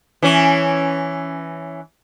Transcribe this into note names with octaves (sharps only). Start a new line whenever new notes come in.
E3 C#4